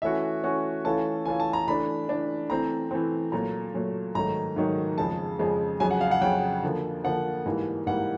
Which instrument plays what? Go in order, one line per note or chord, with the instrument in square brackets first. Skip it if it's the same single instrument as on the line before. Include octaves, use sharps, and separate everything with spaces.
[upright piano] E3 A3 C#4 F#4 [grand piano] E5
[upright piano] E3 A3 C#4 F#4
[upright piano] E3 A3 C#4 F4 A4 [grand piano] A5
[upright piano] E3 A3 C#4 F4 A4 [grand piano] G#5
[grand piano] A5
A#5
[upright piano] E3 A3 D4 [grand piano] B5
[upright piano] E3 A3 D4
[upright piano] E3 A3 C4 [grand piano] A#5
[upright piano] E3 A3 C4
[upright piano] A#2 F#3 A3 [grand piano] A#5
[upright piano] A#2 F#3 A3
[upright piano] G#2 D#3 F#3 A3 [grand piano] A#5
[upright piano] G#2 D#3 F#3 A3
[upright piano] F2 C#3 F3 G#3 [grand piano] A5
[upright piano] F2 C#3 F3 G#3
[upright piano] F2 C#3 F#3 [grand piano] G#5
[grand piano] F#5
F5
F#5
[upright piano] F2 C#3 F#3 [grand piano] G5
[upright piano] D3 F3 A#3
[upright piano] D3 F3 A#3 [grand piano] F#5
[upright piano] G#2 E3 G3 A#3
[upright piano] G#2 E3 G3 A#3 [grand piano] F#5